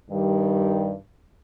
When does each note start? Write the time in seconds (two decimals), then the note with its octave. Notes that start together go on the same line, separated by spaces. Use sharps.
0.10 G2 D#3 G3